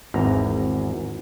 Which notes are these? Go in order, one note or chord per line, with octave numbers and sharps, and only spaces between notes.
G#1 E2 A#5